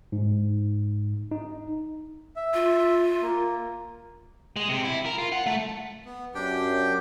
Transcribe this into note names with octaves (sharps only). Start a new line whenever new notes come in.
G#2
D#4
E5
F4
A#3
G#3
C3
E4
A#4
F4
F#5
A3
B3
F#2 D4 G4 G5